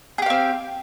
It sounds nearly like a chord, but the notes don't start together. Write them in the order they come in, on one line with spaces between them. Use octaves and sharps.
G#4 G4 F5 C4